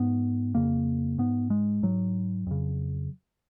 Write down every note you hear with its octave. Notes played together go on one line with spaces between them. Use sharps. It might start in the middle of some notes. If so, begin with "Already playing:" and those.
Already playing: G#2 B3
F2 C#3 A#3
G#2 B3
G#3
G#2 F#3
F2 C#3